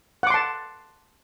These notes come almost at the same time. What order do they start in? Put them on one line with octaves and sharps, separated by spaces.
F#5 D6 C6 A5